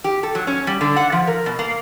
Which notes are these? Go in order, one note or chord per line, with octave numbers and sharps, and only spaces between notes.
G4
A4
F#3
C#4
G3
D3
F#5
F3
A#4
B2
A#3